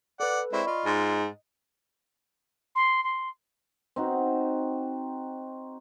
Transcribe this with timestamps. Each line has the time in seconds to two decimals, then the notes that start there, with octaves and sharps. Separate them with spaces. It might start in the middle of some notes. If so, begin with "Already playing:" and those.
0.20 A4 B4 D5 F#5
0.53 G#3 C4 E4 D5 B5 C#6
0.67 F4 D#5
0.85 G#2
2.75 C6
3.04 C6
3.96 C4 D#4 F#4